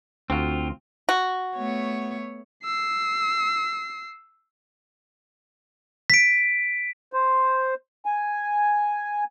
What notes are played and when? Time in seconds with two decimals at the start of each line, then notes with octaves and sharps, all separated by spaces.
0.30 D2 C4 F4 F#4
1.09 F#4
1.56 A3 B3 C#5
2.64 E6 C7
6.10 B6 D7
7.13 C5
8.06 G#5